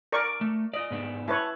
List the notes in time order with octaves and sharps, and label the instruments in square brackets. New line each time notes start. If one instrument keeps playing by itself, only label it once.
[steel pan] A#4 D5 C#6
[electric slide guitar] A3
[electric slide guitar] F4 D5 [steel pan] D#5
[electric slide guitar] G#2 B3 D4
[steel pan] E4 B4 C#5 [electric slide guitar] A5